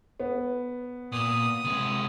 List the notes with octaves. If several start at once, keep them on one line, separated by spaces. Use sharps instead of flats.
B3
A#2 D#6
C3 G#3